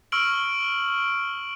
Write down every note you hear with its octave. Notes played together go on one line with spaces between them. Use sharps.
C#6 E6 F6 D7 F#7